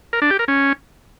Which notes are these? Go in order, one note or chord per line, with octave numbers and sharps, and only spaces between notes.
A#4
D4
G4
A#4
C#4